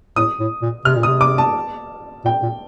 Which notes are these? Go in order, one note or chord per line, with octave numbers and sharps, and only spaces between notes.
A2 D#6
A2
A#2
C3 F6
A#2
C3 D#6
D6
A5
A#2 G5
A#2